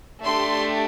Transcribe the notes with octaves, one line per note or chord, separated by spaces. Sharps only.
A3 D4 G4 C6